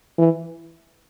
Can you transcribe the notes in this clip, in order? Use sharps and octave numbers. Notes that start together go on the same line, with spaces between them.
E3